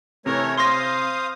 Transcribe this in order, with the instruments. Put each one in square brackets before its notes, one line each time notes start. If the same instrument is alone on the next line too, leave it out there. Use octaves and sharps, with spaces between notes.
[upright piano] C3 [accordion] E3 A3 C#5 [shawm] A#4
[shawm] C5 [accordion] F5 D#6 [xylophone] C6 A#6